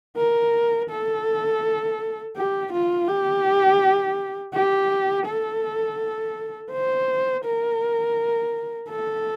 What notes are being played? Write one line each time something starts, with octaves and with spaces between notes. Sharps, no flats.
A#4
A4
G4
F4
G4
G4
A4
C5
A#4
A4